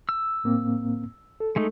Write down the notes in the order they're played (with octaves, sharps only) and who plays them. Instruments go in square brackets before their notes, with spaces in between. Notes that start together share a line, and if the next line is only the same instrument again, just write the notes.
[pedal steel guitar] E6
[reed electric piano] A2 A#3 C4
A4
[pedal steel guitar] G#3 A3 D#4